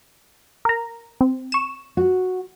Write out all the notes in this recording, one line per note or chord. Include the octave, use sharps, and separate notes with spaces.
A#4 A#5
C4
C#6 E7
F#4